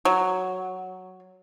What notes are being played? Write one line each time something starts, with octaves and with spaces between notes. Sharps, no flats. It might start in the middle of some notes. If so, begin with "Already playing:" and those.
F#3